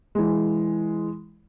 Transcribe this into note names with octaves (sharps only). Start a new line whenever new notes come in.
E3 G#3